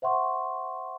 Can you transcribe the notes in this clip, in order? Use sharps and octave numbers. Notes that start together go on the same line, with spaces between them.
C5 E5 F#5 C6 C#6